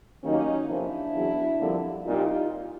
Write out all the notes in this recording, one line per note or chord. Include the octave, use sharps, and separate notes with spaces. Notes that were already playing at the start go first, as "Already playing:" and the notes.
D#2 D#3 F#3 A#3 C#4 D#4
F2 C3 F3 A#3 D4 E4
E2 C#3 F#3
F2 D3 G3 A#3
C2 A#2 G3 D#4 F4